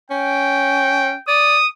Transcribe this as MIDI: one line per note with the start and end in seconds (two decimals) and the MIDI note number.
0.10 1.13 61
0.10 1.21 79
1.28 1.58 74
1.28 1.67 87